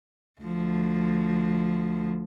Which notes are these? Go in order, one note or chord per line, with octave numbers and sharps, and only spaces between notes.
D2 F3